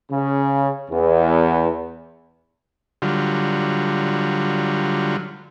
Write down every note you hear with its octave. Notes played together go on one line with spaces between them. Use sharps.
C#3
E2
D3 F#3 G3 F4